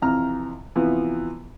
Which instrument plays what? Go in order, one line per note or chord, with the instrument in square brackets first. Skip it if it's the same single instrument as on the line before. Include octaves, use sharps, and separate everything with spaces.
[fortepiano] F2 C3 E3 A#5 F6
C3 E3 F3 B3